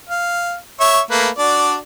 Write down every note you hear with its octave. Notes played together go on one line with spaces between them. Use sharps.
F5
C#5 E5 C#6
A3 A#3 B4
D4 F#4 D5